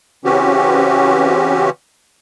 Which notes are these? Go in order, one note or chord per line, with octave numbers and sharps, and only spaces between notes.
C#3 E3 C4 C#4 F#4 G4